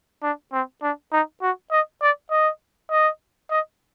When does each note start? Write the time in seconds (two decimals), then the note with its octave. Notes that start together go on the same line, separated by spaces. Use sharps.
0.23 D4
0.53 C4
0.82 D4
1.12 D#4
1.42 F#4
1.72 D#5
2.02 D5
2.31 D#5
2.91 D#5
3.51 D#5